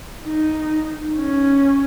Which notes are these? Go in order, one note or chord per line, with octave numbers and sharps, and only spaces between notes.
D#4
C#4